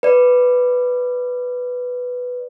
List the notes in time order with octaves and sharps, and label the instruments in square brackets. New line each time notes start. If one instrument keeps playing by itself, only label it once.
[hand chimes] B4 D5